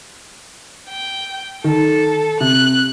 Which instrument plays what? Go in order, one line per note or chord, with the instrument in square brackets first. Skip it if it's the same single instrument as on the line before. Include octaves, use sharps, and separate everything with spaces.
[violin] G5
[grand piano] D#3 [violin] A4
[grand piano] C3 [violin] F#6